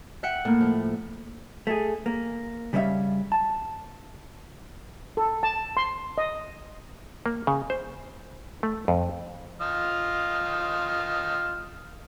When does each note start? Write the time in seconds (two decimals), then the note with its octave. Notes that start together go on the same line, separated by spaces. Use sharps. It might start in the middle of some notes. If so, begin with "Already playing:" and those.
0.23 E5 F#5 G5
0.45 A2 A#3
0.61 F3 A3
1.67 A3 G#4
2.06 A#3
2.73 C#3 G3 C#4 G#4 E5 F5
3.32 A5
5.17 A4
5.43 A5
5.77 C6
6.18 D#5
7.26 A#3
7.47 C#3
7.70 C5
8.63 A3
8.88 F2
9.61 F4 D#5 F6